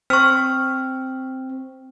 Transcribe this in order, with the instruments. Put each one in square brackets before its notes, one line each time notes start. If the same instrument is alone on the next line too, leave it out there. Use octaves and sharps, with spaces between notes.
[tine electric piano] C4 [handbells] C#6 F6